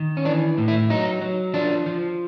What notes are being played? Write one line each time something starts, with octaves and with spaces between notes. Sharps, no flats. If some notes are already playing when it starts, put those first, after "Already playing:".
Already playing: D#3
C#4
E3 D4
A2
E4
F#3 D#4
F#3
F3 D4
F3